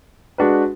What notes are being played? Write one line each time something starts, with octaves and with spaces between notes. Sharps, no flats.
G#3 D4 F#4 B4